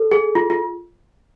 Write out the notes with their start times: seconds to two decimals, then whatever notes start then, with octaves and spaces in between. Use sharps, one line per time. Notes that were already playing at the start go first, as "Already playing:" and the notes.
Already playing: A4
0.12 G#4
0.35 F4
0.50 F4